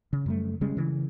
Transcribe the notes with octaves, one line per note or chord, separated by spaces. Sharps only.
C#3
F#2 G3 A3
C#3 G3 G#3 C#4
C#3 E3